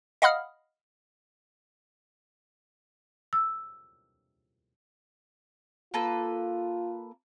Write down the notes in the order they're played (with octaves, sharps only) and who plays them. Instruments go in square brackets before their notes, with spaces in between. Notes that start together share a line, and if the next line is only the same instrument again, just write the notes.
[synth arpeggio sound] D#5 F5 F#5 B5 D#6 F6
[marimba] E6
[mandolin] A#3 A4 B4 [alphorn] F4